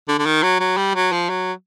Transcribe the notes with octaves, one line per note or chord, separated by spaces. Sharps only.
D3
D3
D#3
F#3
F#3
G3
F#3
F3
F#3